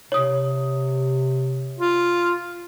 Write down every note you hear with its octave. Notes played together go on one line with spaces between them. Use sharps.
C3 C#5 D#6
F4